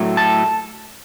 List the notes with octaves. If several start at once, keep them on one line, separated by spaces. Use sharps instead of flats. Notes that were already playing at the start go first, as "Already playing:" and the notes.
Already playing: A2 F#3 A3
A5